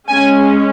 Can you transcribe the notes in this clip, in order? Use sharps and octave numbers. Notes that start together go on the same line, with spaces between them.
G#3 C#4 G#5